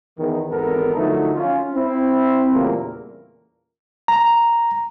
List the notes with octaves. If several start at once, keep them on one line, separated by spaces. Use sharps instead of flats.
E2 D#3
G#1 E2 B3 A4 A#4
D3 F3 F#3 A3 D#4
C#4 F4
C4 E4
E2 A#2 C#3 G3 A3 A#3
A#5